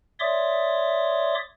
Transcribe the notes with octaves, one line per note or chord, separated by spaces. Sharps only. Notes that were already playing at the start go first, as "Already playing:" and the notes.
C#5 D5 E5 C6 D6 D#6